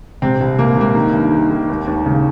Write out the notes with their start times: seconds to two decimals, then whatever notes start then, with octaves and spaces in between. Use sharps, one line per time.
0.22 C3 C4
0.40 C2
0.59 C2 A#3
0.77 C2 A#3
0.95 D#3
1.13 G2
1.32 D#3
1.51 D#3
1.69 D#2
1.87 D#2
2.06 C#3